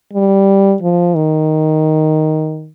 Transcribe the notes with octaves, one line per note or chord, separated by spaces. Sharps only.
G3
F3
D#3